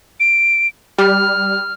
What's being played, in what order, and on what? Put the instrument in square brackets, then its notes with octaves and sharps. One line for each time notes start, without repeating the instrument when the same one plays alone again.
[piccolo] D7
[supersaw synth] G3 [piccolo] F6